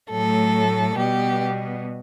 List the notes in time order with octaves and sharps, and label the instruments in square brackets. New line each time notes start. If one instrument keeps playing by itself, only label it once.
[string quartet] A2 F#3 A3 A4
B2 G3 B3 G4